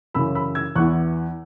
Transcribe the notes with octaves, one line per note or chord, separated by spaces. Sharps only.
F#2 C#3 E3 B5 E6
B5 E6
E6 G#6
E2 E3 B3 E4 C#6 F#6